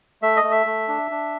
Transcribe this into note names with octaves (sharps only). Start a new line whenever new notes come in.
A3 E5
D#5
A3
E5
A3
D4
D4